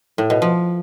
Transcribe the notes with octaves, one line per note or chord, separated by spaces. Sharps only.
A2
B2
F3